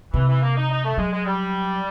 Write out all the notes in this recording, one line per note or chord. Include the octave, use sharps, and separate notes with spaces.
C3 E3
E3
A#3
D#4
D#4
A3
F#3 G#3
G#3
G3